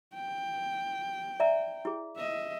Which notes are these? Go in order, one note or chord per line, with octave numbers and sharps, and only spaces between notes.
G5
D5 E5 A#5
E4 G#4
D#5 E5